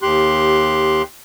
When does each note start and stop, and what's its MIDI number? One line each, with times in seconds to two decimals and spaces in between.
0.02 1.02 39
0.02 1.02 67
0.02 1.02 84
0.02 1.02 90